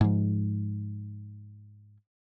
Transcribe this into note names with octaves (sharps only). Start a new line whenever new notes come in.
G#2 F3